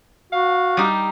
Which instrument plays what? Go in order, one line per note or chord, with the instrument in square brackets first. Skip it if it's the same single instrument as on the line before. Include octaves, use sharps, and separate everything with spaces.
[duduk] F#4 [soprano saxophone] F5
[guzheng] G3 D#4 G4